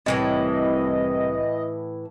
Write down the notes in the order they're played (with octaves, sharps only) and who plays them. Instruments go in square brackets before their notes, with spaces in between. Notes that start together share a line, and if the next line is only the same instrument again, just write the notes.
[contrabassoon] C2 [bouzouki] A2 D#3 E3 [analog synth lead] D#5